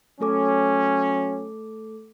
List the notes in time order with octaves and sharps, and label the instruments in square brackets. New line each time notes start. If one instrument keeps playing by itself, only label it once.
[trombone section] F#3 C#4 [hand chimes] A3 A4 D6